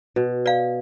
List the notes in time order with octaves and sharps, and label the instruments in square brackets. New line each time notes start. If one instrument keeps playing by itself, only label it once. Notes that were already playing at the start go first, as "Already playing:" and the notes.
[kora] B2
[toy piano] D5 F5